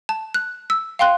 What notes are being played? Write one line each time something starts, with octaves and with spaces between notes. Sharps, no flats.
A5
F#6
E6
F5 G5 C6 F#6